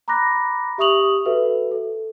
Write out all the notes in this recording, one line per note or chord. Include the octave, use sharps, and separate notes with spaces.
A#5 B5 D6 F#6 A#6
G4 E5 C#6 D#6 F7 F#7
F#4 A4 B4 E5
A4